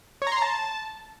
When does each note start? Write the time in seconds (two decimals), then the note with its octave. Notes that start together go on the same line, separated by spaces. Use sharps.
0.22 C#5
0.27 A#5
0.32 C6
0.37 A#5
0.42 A5